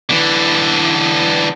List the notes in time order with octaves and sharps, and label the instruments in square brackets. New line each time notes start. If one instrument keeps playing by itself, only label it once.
[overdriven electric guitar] D3 E3